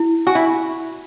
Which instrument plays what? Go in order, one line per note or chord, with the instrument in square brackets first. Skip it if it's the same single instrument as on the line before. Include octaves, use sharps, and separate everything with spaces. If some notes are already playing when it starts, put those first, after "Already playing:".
Already playing: [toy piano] E4
[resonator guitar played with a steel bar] F#4 [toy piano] G#5
[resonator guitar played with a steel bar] E4